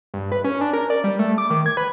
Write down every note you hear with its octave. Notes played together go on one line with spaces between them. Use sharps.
G2
B4
C#4
D4
A#4
D5
G3
A3
D6
D#3
G#6
B4